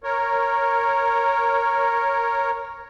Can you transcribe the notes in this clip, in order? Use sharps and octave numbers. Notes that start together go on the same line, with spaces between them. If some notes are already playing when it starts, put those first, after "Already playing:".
A#4 C#5